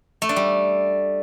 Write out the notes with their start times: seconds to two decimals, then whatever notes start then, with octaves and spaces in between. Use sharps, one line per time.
0.22 A3
0.29 D4
0.36 G3